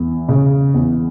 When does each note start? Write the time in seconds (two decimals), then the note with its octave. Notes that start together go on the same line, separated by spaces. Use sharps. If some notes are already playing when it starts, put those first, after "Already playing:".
Already playing: E2
0.29 C#3
0.74 E2